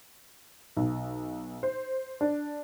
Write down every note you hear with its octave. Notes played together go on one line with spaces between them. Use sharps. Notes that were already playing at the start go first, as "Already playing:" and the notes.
B1
C5
D4